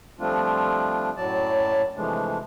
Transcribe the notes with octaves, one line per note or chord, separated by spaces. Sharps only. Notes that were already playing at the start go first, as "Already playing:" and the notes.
F3 G3 A3 C4 D4 F4
F#2 A2 F#3 D5 A5
C3 E3 F3 G#3 A3 D4